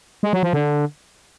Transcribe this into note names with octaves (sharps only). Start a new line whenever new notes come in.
G#3
F#3
F3
D3